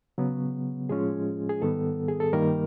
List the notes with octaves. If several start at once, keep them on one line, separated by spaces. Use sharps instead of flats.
C#3 F#3 B3
A2 F3 G#3 C#4 F4 G#4
G#4
G#2 D#3 G3 B3 A4
G#4
A4
G2 D#3 G3 A#3 A#4